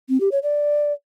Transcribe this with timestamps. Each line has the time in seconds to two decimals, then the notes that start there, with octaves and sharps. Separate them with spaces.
0.09 C4
0.20 G4
0.32 C#5
0.43 D5